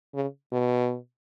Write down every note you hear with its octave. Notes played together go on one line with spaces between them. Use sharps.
C#3
B2